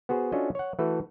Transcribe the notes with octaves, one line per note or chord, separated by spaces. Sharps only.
B3 F#4 G#4 C5
C#4 D4 F4 F#4 A4 D#5
C#5 F#5
E3 A3 F#4 A4 B4